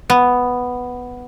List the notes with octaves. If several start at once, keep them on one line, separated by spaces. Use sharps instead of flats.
B3